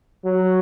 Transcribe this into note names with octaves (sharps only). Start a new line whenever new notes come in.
F#3